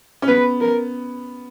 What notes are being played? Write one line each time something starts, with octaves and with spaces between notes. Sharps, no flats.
C#4
B3 B4
A#4